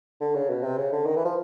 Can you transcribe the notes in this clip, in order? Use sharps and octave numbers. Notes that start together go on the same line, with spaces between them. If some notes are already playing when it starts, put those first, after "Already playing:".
D3
C#3
B2
C3
C#3
D3
D#3
E3
F3